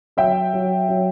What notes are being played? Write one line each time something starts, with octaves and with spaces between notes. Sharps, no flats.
F#3 E5 G5
F#3
F#3